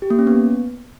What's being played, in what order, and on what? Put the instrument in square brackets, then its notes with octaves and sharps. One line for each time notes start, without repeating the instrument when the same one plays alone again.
[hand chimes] G4
A#3
C#4
B3